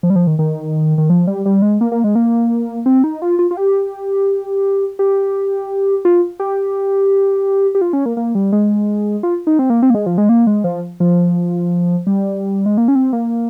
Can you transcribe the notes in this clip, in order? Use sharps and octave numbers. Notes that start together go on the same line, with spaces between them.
F3
G3
F3
D#3
D#3
D#3
F3
G3
G3
G#3
A#3
A#3
G#3
A#3
C4
D#4
F4
F4
F4
G4
G4
F4
G4
G4
F4
C#4
A#3
A#3
G3
G#3
F4
D#4
C4
A#3
C4
A#3
G#3
F3
G#3
A#3
G#3
F3
F3
G3
G#3
A#3
C#4
C4
A#3